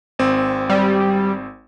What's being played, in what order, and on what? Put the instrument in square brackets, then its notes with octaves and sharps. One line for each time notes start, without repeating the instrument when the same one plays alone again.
[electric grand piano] G#1 C4
[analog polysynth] G3